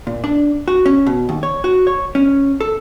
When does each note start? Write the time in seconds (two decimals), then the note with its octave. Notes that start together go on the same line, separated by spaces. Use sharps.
0.07 A#2
0.24 D4
0.68 F#4
0.86 C#4
1.06 B2
1.29 D#2
1.43 C#5
1.64 F#4
1.87 C#5
2.15 C#4
2.61 A4